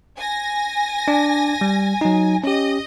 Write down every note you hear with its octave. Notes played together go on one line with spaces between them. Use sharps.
G#5 A#6
D4 D5
G3
F#3 D#4
C#4 G4 D#5